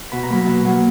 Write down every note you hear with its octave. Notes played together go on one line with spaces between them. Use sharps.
B2 B5
A#5
F#3 A#3 B5
B2
F#3 A#3